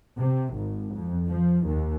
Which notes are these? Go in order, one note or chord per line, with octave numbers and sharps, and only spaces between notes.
C3
G#1
F2
F3
D#2